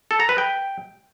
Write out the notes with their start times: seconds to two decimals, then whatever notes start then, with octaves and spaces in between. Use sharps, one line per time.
0.11 A4
0.20 A#5
0.29 B4
0.38 G5